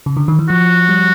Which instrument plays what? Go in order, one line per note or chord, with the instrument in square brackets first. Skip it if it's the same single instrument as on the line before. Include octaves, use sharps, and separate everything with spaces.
[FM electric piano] C#3
D3
D#3
E3
[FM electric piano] F3 [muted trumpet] F#4
[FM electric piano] G3